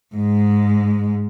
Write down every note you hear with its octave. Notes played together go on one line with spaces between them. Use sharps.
G#2 G#3